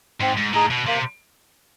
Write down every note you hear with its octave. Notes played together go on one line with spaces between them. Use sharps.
G#2 C4
G#2
A2 D#4 G#4
B2
C3 A#3